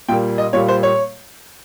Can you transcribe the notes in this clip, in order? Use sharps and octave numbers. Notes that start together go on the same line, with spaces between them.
A#2 G3 A#3 G5
D#5
A#2 G3 A#3 C#5
C5
C#5